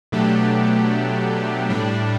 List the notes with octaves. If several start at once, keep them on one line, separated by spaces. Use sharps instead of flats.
B2 F#3 A3 D4 G4
A2 G3 D4